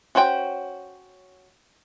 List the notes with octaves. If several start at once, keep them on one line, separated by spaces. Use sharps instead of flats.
C#4 F#4 C5 C#5 G5